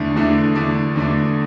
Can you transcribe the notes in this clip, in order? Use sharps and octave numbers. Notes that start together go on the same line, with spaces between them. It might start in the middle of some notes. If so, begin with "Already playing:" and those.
Already playing: E2 D3 A3 D4
E2 D3 A3 D4
E2 D3 A3 D4
E2 D3 A3 D4